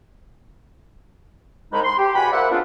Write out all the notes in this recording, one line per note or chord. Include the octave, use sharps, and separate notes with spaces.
C2 G#3 D#4 B5
C6
G4
E2 F#4 F#5 G#5 B5
A#3 C5 D5 E5 F#5
G#3 B3 C4 D4 F4